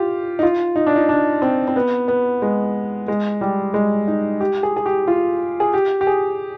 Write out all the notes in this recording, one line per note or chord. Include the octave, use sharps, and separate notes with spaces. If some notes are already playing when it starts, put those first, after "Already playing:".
Already playing: F4 G4
D#4
F4
D#4
D4
D#4
D4
C4
C4
B3
B3
G#3
G#3
G3
G#3
D#4
G4
G#4
G#4
G4
F4
G#4
G4
G4
G#4